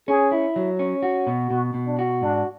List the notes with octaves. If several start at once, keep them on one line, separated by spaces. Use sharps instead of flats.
C#4 G#4
E4
F#3
C#4
F#4
B2
B2 F#4
B2
D4
F#4
G#2 D4